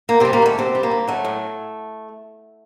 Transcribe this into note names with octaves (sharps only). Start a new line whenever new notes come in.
D2 A#3
C3 G3 C4
A#3
D2 A3
D2 C3 C4
G3
A#3
D2
F#3 A3
A2